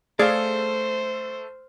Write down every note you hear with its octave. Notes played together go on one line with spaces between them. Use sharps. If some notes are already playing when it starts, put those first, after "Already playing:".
A3 G#4 A4 C5 D5 F5 F6